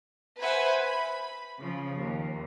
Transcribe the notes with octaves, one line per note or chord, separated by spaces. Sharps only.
B4 C5 E5 F#5 G#5 B5
B5
C#3 F3
D#2